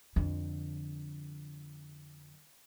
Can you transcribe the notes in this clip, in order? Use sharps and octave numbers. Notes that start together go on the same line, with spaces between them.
F2 D3